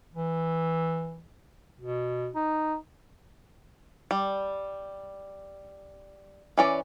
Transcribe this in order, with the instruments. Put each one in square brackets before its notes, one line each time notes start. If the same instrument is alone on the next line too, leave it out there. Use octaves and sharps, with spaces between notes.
[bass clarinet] E3
B2
D#4
[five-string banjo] G3
E3 C#4 D5